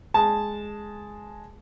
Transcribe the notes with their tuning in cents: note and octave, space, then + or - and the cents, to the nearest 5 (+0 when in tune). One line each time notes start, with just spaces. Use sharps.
G#3 +0 A5 -5